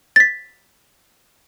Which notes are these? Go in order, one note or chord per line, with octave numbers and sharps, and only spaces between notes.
A6 B6